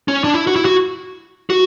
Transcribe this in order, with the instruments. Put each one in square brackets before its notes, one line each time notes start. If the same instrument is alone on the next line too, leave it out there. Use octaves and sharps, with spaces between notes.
[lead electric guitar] C#4
D4
E4
F#4
E4
F#4
F#4